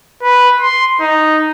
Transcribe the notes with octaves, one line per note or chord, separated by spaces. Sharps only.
B4
C6
D#4